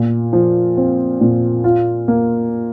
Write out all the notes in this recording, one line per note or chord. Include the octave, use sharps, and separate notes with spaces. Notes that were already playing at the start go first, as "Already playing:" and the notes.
Already playing: A#2
F3
C4
A#2
F4
A#3